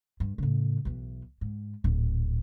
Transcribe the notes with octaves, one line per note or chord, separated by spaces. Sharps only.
G2
A2 C#3
B1 E3
G#2
D1 A#1